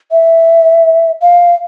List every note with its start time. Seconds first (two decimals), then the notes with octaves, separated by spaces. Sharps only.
0.12 E5
1.22 F5